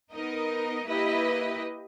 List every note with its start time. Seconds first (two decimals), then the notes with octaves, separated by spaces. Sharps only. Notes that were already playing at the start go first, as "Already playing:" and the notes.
0.12 B3 D#4 A#4 D#5
0.87 A#3 E4 G4 B4 D#5